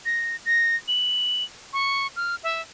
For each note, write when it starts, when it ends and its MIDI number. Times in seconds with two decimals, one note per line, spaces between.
0.06 0.36 94
0.46 0.76 94
0.88 1.43 102
1.73 2.07 85
2.16 2.35 89
2.43 2.62 76